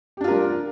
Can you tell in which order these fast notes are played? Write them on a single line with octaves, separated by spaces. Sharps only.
G4 D4 F4 A#4 G3